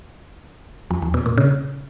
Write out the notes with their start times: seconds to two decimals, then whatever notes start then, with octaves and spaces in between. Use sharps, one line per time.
0.91 F2
1.02 E2
1.14 B2
1.26 A#2
1.38 C#3